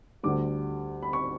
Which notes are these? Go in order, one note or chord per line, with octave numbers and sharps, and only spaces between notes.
D2 D3 G3 D6
B5
C#6